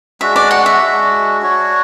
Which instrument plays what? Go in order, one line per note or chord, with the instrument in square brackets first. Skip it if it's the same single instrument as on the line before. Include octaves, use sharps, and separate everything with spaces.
[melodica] G#3 D4 F#4 [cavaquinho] E5
[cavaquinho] D5
F#5
E5
[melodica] G#3 D4 F#4
D4 F#4 C#5